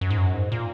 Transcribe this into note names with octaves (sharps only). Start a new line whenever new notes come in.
F#2
G#2
F#2
G#2
A#2